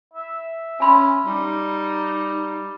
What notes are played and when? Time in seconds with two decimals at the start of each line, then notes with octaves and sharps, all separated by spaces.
0.14 E5
0.80 C#4 G#5 B5 C6
1.26 G3 D#4